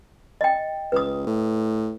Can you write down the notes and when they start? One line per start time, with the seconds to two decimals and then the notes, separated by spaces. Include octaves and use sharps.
0.41 D#5 G5
0.92 C#2 B4 D#6
1.27 A2